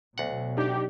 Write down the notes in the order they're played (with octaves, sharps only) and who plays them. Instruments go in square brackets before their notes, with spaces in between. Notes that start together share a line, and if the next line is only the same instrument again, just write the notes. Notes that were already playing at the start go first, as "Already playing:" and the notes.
[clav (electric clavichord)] D2 F#5 [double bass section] B2 F#3
[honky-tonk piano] D4 D#4 [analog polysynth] G4